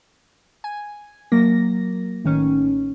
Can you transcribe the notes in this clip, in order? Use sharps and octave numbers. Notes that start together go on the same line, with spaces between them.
G#5
F#3 A#3 A#6
A1 D#3 C#4